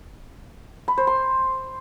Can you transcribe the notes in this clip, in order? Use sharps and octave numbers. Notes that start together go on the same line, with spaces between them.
B5
C5
C6